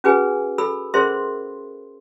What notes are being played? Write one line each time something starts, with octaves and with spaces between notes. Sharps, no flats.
C#4 F#4 G#4 B4 G#5
A4 B5 E6
C#4 G#4 A#4 C5 E5 C6